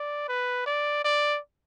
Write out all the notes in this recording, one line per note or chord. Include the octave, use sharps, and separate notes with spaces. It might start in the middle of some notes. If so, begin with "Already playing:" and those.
Already playing: D5
B4
D5
D5